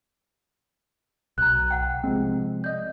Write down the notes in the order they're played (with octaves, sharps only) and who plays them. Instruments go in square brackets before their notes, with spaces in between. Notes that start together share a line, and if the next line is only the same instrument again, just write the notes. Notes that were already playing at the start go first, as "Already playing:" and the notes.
[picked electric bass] B1 [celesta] A#5 F#6
[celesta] F#5 G5
[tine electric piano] C3 F3 G#3 [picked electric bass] C4
[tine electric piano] D5 D#5 [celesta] G6